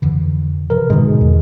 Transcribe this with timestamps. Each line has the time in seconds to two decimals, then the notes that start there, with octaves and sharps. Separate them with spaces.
0.02 F2 D3 E3
0.70 C3 F3 A#4 B4
0.90 G#2 B2 D3 D#3 G#3
1.21 E2